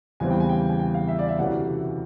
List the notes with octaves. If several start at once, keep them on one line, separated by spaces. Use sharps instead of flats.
E2 C#3 E3 G3 C4 G#5
G5
G#5
G5
G5
G#5
G5
F5
E5
D5
E5
D2 C3 E3 A3 C#4 F#5